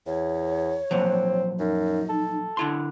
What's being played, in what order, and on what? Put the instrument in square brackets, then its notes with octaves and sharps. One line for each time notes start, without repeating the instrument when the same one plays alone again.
[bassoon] E2 [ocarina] C#5
[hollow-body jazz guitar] A#2 F3 F#3 [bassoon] C4
[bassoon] F#2 [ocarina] D#4
[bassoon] A4
[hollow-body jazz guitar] D3 E4 C6